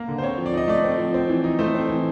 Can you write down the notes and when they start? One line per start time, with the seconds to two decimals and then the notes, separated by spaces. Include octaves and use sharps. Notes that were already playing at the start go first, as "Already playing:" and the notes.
Already playing: A#3
0.08 D3
0.18 C5
0.22 C4 C#5
0.38 F3
0.46 D5
0.53 D#4 D#5
0.68 A3 D5
0.84 C4
0.98 F3
1.14 C4
1.29 E3
1.44 D#4
1.59 A3 C5
1.74 C4
1.89 E3